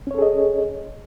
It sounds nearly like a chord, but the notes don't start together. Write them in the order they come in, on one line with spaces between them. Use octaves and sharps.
C#4 C#5 A4 G#4 D#5